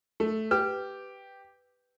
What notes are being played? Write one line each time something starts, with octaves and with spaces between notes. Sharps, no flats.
A3
G4 B4